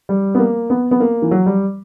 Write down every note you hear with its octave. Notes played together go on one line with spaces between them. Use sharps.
G3
B3
A#3
B3
B3
A#3
E3
F#3
G3